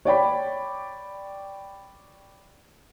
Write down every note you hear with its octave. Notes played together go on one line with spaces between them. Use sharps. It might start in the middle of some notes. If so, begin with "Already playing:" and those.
C#5 D5 G5 B5